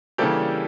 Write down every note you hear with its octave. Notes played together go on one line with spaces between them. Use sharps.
C#3 E3 G3 A#3 D4 G4 A4